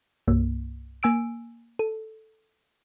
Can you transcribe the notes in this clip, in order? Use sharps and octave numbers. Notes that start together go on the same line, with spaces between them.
C2 G2 A#3
A#3 G#5 E6 D7
A4